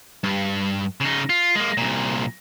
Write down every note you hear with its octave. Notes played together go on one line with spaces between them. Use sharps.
G2
C#3 D#4
F4
G#3 A#3
C2 A#2